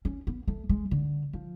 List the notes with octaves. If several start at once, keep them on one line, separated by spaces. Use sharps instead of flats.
C#4
B3
A3
G#3
D3
F3